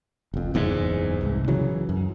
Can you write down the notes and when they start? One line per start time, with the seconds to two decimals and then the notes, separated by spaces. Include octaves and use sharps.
0.34 F1 F2
0.54 F#1 E2 G#2
1.21 C2 G#2
1.48 C#3 E3 F#3
1.89 F#2